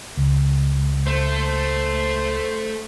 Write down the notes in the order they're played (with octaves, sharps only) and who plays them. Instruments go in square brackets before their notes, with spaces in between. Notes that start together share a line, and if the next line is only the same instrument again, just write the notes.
[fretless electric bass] C#2
[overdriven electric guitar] A3 [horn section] C5